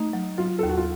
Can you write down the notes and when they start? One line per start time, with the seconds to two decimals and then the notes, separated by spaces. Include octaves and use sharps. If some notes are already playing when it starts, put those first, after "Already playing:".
Already playing: A3 D#4
0.13 F#3
0.38 F#3 F4
0.59 D#2 A4
0.69 F#4
0.78 F4